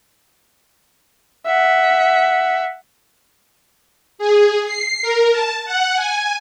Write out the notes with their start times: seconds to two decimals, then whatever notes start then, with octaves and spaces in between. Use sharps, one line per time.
1.46 E5 F#5
4.19 G#4
4.66 C7
5.02 A#4
5.32 A5
5.65 F#5
5.96 G#5